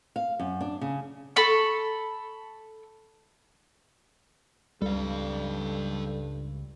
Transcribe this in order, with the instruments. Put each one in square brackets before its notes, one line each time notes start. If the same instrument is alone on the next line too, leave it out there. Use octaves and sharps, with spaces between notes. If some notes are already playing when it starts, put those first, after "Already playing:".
[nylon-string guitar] F5
F#2
D4
C#3
[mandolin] A4 B5 C#6
[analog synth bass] C#2 [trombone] G2 [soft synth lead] G3 [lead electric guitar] A4 F5